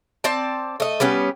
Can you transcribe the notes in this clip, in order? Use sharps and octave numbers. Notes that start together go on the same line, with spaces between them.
C4 D5 A5
A3 D#5
G3 B3 C#4 G4